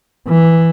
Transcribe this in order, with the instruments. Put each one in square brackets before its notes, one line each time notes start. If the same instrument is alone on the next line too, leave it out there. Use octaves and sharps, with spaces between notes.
[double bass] E3